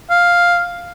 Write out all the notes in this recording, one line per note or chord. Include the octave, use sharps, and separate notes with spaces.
F5